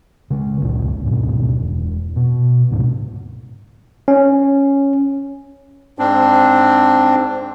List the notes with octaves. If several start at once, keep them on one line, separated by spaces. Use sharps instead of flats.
C#3 G#3
G1 C#2 A#2 D4
D1 G#2 B2
E1
B2
D2 G#2 C3
C#4
G#2 C4 D4